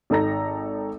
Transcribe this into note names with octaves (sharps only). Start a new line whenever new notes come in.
G#1 D#4 A4 A#5 A#6